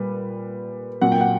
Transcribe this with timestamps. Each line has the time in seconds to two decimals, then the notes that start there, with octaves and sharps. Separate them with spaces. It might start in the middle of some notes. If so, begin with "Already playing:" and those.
Already playing: A#2 G3 B4
1.01 A#2 F#3 F#5
1.12 G5
1.21 F#5